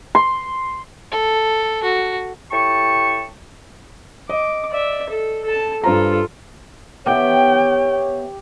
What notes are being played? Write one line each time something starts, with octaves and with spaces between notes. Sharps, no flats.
C6
A4
F#4
A2 G4 A5 C#6
D#5 D6
D5 E5
A4
A4 A5
G2 F4 A4 C5 A#5
B3 G4 C#5 E5 G5